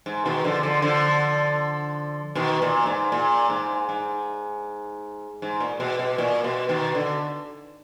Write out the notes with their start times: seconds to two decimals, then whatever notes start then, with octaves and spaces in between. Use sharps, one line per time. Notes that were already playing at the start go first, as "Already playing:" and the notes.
0.06 G#2
0.25 B2 D#3
0.44 D3 F3
0.63 D3 F3
0.82 D3 F3
2.35 B2 D#3
2.62 A#2
2.86 G#2
3.12 A#2
3.50 G#2
3.89 G#2
5.42 G#2
5.60 A#2
5.80 B2
5.99 B2
6.18 A#2
6.44 B2
6.69 B2 D#3
6.95 D3